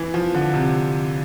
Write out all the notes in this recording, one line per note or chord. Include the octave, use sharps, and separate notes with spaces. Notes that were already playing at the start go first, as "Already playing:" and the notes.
Already playing: E3
F3
D3
C3